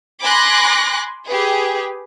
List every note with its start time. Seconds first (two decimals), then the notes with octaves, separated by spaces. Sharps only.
0.22 G#5 B5 C6 D6 F#6 A#6
1.27 G4 G#4 B4